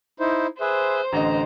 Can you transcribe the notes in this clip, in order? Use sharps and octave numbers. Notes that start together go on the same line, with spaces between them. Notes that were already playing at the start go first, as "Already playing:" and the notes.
D#4 E4 C5
G#4 B4 C5 E5
A1 D3 D#5 A#5